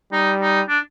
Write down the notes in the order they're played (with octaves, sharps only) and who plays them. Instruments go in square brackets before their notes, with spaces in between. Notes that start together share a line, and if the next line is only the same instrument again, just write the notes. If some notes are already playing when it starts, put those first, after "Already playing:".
[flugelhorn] G3 [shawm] D#4
[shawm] D#4
D4